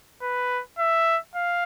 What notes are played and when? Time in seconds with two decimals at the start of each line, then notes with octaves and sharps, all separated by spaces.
0.22 B4
0.78 E5
1.35 F5